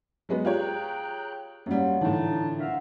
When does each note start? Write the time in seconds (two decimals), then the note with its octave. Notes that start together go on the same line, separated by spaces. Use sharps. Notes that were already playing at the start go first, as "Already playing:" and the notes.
0.29 F#3 G#3 B3
0.45 F4 G4 G#4 C#5 G5 A#5 F#6
1.66 F#2 F#3 G3 A#3 F4
2.01 A2 D3 E3 D4 D#4 A5
2.59 F#4 A#4 C5 E5 F5